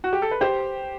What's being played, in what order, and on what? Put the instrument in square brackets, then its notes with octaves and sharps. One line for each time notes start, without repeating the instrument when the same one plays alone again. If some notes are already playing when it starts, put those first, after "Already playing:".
[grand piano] F#4
G4
A4
B4
[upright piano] G4 [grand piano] C5